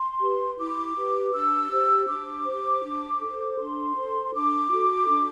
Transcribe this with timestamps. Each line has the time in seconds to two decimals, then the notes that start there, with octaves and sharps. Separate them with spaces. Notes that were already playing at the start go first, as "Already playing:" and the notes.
Already playing: C6
0.21 G4 B4
0.58 E4 D6
0.96 G4 B4
1.33 D4 E6
1.71 G4 C5
2.08 D4 D6
2.46 G4 C5
2.84 D4
3.21 A4 C5
3.59 D4 C6
3.96 A4 C5
4.25 C6
4.34 D4 D6
4.71 F#4 A4
5.08 D4